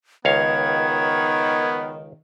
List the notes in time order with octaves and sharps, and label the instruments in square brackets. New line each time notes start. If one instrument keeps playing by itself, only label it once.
[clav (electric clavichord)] C#2 C#5 F5 [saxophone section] D#3 [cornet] B3 [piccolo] G#6